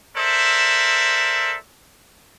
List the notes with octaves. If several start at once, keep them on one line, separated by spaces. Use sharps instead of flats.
A4 A#4 C5 D5 E5